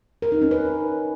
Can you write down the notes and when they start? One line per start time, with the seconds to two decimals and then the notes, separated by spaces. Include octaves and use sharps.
0.22 A#4
0.32 D#4
0.42 C#4
0.51 B4